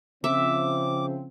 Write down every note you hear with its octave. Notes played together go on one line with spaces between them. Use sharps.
C#3 F3 C4 E5 D6